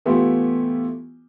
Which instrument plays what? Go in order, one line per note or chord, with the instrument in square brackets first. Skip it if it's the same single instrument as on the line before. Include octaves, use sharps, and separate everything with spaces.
[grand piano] E3 A3 B3 E4 F4 G4